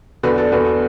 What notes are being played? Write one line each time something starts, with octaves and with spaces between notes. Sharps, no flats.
E2 D3 F#4 B4
A4 D5
E2 D3 F#4 B4